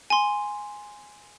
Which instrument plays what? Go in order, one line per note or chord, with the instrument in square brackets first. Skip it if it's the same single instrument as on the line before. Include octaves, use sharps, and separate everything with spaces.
[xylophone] G#5 C6